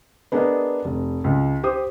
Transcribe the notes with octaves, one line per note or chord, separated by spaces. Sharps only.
B3 D4 G#4 A#4 D5 D#5
F1
C#2
G4 C5 D#6